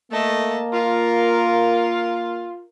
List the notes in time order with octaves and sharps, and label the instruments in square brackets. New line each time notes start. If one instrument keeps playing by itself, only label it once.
[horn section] A3 [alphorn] A#3 [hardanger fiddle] D#5 A5
[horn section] F4 [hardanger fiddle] A#4